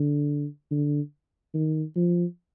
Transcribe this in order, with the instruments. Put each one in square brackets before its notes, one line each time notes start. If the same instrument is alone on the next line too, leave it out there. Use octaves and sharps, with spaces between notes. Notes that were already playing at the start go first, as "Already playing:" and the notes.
Already playing: [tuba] D3
D3
D#3
F3